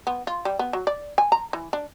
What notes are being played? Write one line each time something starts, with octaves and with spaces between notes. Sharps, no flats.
B3
F4
G3
B3
F#3
D5
G#5
A#5
E3
D4